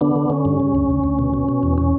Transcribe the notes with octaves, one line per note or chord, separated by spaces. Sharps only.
D3 B3 D4
D3
D3 C#4
G2
C#3
D2
D2
D2
B2
B2
B2
E2
C#4